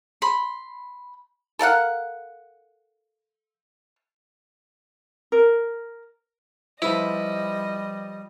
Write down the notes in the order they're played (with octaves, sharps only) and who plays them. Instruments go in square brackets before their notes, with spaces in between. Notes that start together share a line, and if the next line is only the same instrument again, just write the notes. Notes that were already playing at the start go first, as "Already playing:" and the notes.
[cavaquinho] B5 C6
[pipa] A4 A#4 F5 F#5
[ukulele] A#4
[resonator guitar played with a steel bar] F3 B4 C5 [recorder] G3 [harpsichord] E4 [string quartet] D#5